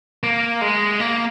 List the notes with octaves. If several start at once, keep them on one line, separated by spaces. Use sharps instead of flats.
A#3
G#3
A#3